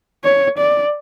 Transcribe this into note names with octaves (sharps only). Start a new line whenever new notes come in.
C#5
D5